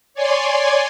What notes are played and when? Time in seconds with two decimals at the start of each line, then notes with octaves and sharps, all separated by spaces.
0.14 C#5 D5 G#5 C6